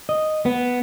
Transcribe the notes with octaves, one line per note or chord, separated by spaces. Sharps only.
D#5
B3